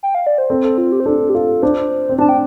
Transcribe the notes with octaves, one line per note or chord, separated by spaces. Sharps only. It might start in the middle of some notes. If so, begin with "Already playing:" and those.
G5
F5
D5
C5
C4 A4
A4
F4
G4
C5
D4 A4
G4
F4 A4
D4 C5
C4
D4 A5
G5